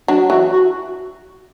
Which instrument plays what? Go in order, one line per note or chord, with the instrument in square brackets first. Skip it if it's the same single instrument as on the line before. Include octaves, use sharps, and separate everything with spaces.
[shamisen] F#3 [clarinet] D4
[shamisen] E3 [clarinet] F#4
[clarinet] F#4